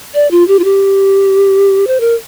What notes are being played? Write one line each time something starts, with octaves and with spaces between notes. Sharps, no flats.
D5
F4
G4
F4
G4
C5
A#4